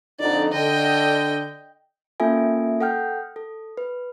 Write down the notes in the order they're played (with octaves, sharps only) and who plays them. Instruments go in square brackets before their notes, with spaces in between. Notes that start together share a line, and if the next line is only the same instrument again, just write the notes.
[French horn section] F2 D3 D#4 [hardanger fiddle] D5 F#5
[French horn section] D3 [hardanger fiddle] D#5 G5
[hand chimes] A#3 C#4 F4 A4 E5 G#5
A4 F#5 G5 F6 G6
A4
B4